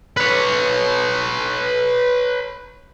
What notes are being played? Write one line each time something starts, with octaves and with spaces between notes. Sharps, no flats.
B4 C#5